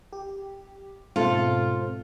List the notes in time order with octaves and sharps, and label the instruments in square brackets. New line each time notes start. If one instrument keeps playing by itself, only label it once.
[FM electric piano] G4
[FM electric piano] G#2 B2 [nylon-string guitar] C4 A4 [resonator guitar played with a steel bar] F4